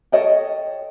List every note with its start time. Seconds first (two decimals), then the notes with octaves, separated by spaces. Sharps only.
0.12 A4 C#5 D#5 G5